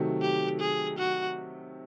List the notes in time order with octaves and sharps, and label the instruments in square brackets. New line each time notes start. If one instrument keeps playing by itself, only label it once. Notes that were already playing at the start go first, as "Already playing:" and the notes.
Already playing: [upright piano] C3 D#3 F#3 A3
[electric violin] G4
G#4
F#4